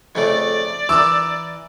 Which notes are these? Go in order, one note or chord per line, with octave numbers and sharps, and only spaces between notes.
F2 C#3 A3 D5
E3 A#4 D6 E6